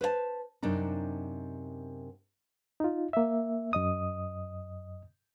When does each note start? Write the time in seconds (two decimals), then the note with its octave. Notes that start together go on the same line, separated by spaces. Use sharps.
0.01 B4 C5 E5 A5
0.62 F#2 C3 D4 D#4
2.80 D#4 F4
3.13 A#3 E5
3.73 F#2 D#5 D#6